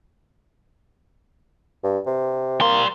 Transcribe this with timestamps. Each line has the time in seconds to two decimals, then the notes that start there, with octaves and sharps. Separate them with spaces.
1.84 G2
2.06 C3
2.61 G3 A#3 C6